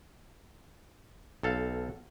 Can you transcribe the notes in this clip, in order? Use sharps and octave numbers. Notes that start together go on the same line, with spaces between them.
B1 A4 F5